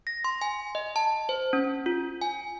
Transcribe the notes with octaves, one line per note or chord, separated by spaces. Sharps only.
A#6
C6
G#5
D#5
A5
C5
C#4
F4
G#5